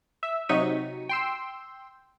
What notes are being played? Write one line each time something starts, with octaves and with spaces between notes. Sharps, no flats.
E5
C3 F#3 D#4 C#6 B6 D#7
G5 C6 E6